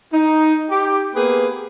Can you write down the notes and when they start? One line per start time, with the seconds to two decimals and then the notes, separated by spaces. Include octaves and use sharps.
0.13 D#4
0.70 G4
1.15 A#3 B3 G#4 B4